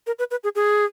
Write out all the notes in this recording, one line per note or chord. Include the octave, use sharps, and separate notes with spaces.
A#4
B4
B4
G#4
G#4